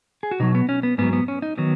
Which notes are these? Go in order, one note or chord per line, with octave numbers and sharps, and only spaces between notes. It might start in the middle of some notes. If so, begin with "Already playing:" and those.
G#4
F#4
B2 F#3 D#4
B3
C#4
B3
G#2 F#3 B3
B3
C#4
D#4
D#3 F#3 B3